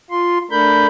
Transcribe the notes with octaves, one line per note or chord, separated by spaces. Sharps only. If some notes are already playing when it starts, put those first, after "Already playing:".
F4 C6
A3 D4 A#4 B5 G6